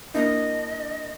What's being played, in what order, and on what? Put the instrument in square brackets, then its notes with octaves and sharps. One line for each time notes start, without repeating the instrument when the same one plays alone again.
[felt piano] A#3 D4 E4 [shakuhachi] D#5